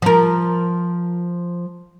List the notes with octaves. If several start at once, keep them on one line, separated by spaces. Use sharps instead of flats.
F3 A#4